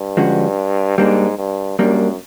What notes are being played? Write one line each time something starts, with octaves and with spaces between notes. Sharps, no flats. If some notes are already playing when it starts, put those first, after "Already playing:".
Already playing: G2
D3 F3 G#3 C#4 F#4
G#2 G3 A#3 D4
G2
F#2 G3 A#3 D4